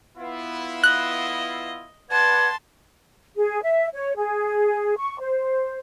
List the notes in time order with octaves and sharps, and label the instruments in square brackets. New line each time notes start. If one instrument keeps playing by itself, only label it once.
[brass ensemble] B3 E4 F4
[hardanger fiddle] D#5 [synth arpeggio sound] F#6
[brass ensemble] B4 D5 F#5 [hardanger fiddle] A5 C6 [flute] G#6
[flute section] G#4
E5
C#5
G#4
C#6
C5